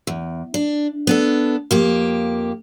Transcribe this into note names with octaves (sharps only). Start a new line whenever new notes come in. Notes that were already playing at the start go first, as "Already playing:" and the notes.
E2
D4
B3 D4 A4
F2 A#3 G4